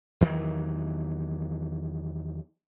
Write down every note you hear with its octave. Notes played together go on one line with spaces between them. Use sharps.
E2 D#3 E3 F#3